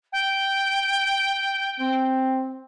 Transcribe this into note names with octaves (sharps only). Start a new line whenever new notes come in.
G5
C4